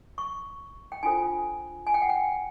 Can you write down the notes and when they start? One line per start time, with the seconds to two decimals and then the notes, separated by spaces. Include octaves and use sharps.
0.18 C#6
0.92 G5
1.03 D4 F4 A4 C5 G#5
1.87 G#5
1.94 G5
2.02 F#5
2.09 G5